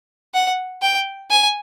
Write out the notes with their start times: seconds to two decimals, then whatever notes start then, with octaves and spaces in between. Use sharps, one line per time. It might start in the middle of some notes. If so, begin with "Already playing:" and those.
0.34 F#5
0.82 G5
1.31 G#5